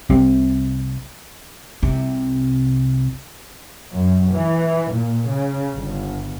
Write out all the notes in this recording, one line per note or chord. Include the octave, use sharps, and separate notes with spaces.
C2 C3
C2 C3
F#2
E3
A#2
C#3
G1